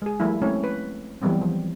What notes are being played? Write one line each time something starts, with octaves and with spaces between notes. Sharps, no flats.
G#3 G#4
F3 G3 A3 A#3 E4
G#3 A3 C4 C#4 E4 C#5
B4
E3 F#3 G3 B3 C4
F3